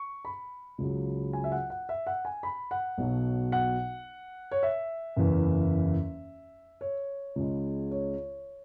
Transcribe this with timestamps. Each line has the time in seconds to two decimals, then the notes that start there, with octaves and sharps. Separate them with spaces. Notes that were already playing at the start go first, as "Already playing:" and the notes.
Already playing: C#6
0.25 B5
0.78 C#2 C#3 F#3
1.33 G#5
1.44 E5
1.52 F#5
1.70 F#5
1.89 E5
2.07 F#5
2.25 G#5
2.43 B5
2.71 F#5
2.98 B1 B2 F#3
3.52 F#5
4.51 C#5
4.63 E5
5.16 F#1 E2 E3
6.81 C#5
7.36 C#2 C#3 G#3
7.91 C#5